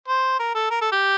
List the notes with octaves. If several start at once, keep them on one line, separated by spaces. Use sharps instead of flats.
C5
A#4
A4
A#4
A4
G4